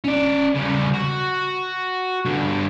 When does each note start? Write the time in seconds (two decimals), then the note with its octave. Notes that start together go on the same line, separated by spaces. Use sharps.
0.04 C#4 D5
0.55 C#3 G3
0.94 F#4
2.25 G2 D3